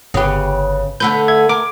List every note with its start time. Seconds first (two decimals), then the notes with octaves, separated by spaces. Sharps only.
0.14 G1 C#3 G4 B4
1.00 D3 A3 B4 G6
1.28 E5 G#6
1.49 A#4 D6